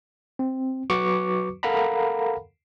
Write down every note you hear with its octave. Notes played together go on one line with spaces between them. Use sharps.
C4
F#3 F#4 B4 C#6 D6 C#7
A4 A#4 F5 F#5 A#5 B5